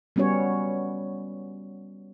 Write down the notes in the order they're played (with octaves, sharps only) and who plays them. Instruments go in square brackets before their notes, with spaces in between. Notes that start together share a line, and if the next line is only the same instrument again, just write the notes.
[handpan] G3 B3 C#4 F#4 C#5